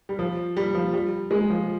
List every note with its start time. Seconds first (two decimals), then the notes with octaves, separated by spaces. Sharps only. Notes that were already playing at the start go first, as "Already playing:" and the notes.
0.09 G3
0.19 F3
0.57 G3
0.75 F3
0.94 G3
1.31 G#3
1.50 F3